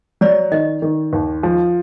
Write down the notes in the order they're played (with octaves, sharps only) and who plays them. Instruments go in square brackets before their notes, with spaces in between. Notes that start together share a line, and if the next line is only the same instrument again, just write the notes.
[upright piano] F#3 [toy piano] D5
[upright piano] D#3 [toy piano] D#5
[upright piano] D#3
D#2
F3